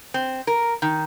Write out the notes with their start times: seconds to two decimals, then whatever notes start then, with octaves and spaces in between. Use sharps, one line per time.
0.14 C4
0.47 A#4
0.82 D#3